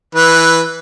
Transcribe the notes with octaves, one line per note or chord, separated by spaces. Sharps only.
E3 B4